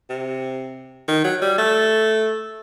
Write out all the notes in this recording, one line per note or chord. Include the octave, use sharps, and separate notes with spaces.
C3
D#3
F#3
G3
A3